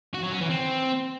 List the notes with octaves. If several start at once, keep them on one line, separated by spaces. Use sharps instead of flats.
F#4
F#3
C#4
E3
C4